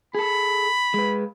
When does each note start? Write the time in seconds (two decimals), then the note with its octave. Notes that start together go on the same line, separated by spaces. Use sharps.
0.15 G#4 A4 B5
0.94 G#3 B4